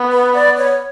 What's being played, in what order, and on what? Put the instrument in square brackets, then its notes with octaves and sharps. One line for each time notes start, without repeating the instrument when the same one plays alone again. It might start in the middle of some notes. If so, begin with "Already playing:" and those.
Already playing: [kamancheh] B3
[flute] B4
D5
C#5